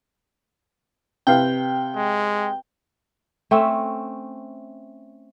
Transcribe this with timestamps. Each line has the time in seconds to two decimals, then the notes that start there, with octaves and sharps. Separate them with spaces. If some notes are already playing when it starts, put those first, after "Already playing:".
1.27 C3 B4 F5 G5
1.96 G#3
3.51 A3 C4 C#4 E5